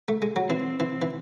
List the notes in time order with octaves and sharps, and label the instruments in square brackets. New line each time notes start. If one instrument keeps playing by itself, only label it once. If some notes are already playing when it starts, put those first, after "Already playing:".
[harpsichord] A3
G#3
F#3
[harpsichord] E3 [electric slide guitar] C4
[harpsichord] E3 [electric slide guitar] C4
[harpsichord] E3